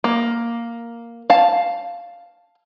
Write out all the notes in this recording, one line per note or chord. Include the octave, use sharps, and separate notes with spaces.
A#3
F5 A5